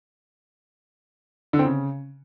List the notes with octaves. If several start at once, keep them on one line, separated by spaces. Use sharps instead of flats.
D3
C4
C#3